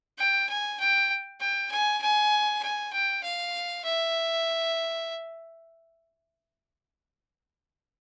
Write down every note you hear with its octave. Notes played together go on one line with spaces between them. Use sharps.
G5
G#5
G5
G5
G#5
G#5
G#5
G5
F5
E5